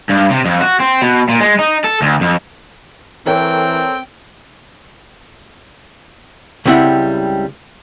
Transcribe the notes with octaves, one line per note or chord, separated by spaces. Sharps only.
G2
C3
F2
F#4
C4
B2
A#2
G#3
D#4
A4
D2
F2
E3 C4 A4 A#4 C#5 G5
C#2 G3 C4 E4 F#5